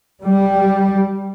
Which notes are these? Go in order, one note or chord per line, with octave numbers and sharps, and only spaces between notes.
G3